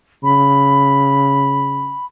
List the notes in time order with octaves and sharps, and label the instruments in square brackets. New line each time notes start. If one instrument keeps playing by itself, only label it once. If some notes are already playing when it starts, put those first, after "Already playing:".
[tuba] C#3 [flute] B5